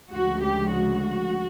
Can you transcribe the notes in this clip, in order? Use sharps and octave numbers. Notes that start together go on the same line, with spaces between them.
D2 C#3 F3 G#3 F#4
G4
F#4